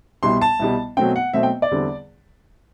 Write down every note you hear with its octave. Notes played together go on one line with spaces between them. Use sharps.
C2 B2 G3 C6
A5
C2 B2 G3
B2 F#3 A3 C4 G5
F#5
B2 F#3 A3 C4 E5
G5
D5
E2 D3 G3 C4